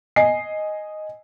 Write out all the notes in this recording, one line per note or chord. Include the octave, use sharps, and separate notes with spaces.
D#5 G#5 C7